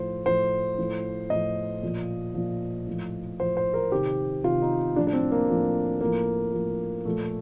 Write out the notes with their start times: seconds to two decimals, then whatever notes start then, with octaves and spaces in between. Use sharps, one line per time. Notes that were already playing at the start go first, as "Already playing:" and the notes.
Already playing: A2 F3 C5
0.26 A2 F3 C5
0.78 A2 F3
1.30 A2 F3 D#5
1.83 A#2 F3
2.34 A#2 F3
2.87 A2 F3
3.39 A2 F3 C5
3.57 C5
3.74 A#4
3.92 C3 D#3 G4
4.44 C3 D#3 F4
4.62 D#4
4.96 A2 F3 D4
5.07 D4
5.13 C4
5.32 A#3
5.49 A2 F3
6.00 A2 F3 A#3
6.54 A2 F3
7.05 A#2 F3 A3